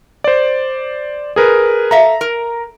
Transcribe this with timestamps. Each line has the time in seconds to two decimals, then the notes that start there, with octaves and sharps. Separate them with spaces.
0.24 C5 D5
1.36 G#4 A#4 B4
1.91 A4 E5 F5 A#5
2.21 A#4